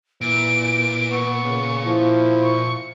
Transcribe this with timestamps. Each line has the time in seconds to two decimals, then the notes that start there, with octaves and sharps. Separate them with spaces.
0.21 A#2 E3 D7
1.11 B3 C#6
1.45 C#3
1.86 F3 E4
2.43 C#6